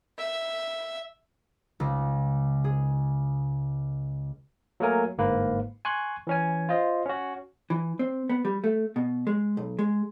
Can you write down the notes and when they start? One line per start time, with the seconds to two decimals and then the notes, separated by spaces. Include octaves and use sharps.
0.18 E5
1.80 C#2
2.64 G#4
4.80 F#3 A3 A#3 A#4 G#5
5.18 G1 G#2 A#3 B4
5.85 G#5 C6 C#6 F#6
6.27 E3 C#4 G#5
6.69 F4 C5 D#5
7.06 C#4 F#4
7.70 E3
7.99 C4
8.29 B3
8.45 G3
8.64 A3
8.96 B2
9.27 G#3
9.57 B1
9.79 G#3